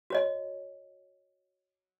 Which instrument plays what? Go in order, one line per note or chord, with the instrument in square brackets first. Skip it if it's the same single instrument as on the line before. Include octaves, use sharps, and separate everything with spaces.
[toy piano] F#4 C#5 D#5